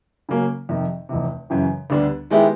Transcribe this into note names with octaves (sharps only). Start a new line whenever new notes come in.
C#3 F#3 A#3 C#4
F2 C3 D#3
F1 E2 C3
F#2 C#3 E3
D2 D3 G3 B3 D4
D#3 G#3 B3 E4 G4